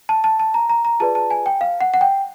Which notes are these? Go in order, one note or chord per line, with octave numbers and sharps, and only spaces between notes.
A5
A5
A5
A#5
A#5
A#5
F4 G#4 B4 D5 A5
A5
G#5
G5
F5
F#5
F#5
G5